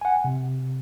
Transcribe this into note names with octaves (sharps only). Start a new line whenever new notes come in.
F#5 G#5
C3